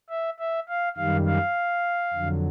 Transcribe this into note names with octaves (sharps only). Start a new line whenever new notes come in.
E5
E5
F5
F#2 D#3 G3 F5
F5
F2 D3 F#3